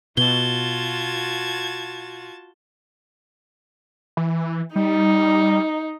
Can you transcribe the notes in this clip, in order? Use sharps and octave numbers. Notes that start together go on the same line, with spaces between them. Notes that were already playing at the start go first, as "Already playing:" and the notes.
B2 F4 F#4 A5 G#6 G7
E3
G3 D#4